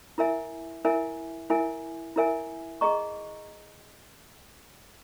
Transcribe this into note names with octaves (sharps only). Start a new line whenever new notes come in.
E4 A#4 E5 G#5
E4 A#4 E5 G#5
E4 A#4 E5 G#5
E4 A#4 E5 G#5
G#4 D#5 A#5 C#6